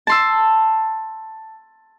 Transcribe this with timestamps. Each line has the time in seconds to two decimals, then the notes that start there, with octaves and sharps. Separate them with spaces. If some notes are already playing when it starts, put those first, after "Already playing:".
0.07 A5 C6 E6